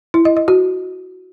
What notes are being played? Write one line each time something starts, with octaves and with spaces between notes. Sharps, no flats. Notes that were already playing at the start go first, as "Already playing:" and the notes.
E4
D#5
D#5
F#4